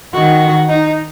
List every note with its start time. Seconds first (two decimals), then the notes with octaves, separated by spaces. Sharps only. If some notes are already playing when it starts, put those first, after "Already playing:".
0.14 D#3 F#4
0.69 D#4